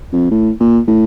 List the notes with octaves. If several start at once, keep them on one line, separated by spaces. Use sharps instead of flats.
F2
A2
A#2
A2